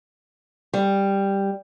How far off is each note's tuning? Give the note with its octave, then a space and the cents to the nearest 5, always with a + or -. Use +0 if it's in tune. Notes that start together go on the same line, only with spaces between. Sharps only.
G3 +5